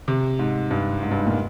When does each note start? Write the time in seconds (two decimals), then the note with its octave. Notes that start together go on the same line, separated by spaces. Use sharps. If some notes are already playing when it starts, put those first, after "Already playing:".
0.08 C3
0.39 G#2
0.71 G2
1.03 G#2
1.11 G2
1.19 G#2
1.27 A#2